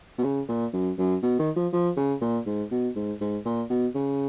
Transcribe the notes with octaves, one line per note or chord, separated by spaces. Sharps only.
B2
C#3
A#2
F#2
F#2
B2
D#3
F3
F3
C#3
A#2
G#2
B2
G#2
G#2
A#2
B2
C#3